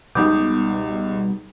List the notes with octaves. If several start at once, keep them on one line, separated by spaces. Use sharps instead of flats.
C#2 B2 G3 B3 D#4 D6 D#6 G6